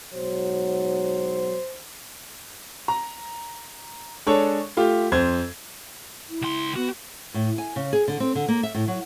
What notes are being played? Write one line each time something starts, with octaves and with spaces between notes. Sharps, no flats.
B1 G#2 F#3 C5
A#5
G#3 D4 A4 C#5
A3 F4 G4
F2 C5 G#6
E4
C#2 C6
B3 F#4
A2
G#5
C#3
G#4
D3
C4
D3
A#3
E5
A2
F#3